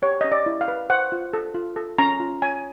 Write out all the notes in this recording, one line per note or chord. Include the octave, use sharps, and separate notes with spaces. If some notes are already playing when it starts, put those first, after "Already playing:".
G4 C#5
C#4 D#5
D5
E4
F5
B4
C5 F#5
F4
A4
F4
A4
C#4 A#5
F4
C#5 G#5